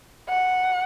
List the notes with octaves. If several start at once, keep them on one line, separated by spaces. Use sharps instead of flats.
F#5